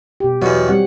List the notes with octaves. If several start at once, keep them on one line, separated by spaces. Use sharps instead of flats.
B2 G4
E2 B2 F#3 C#5 F#5
G3 C4 F#5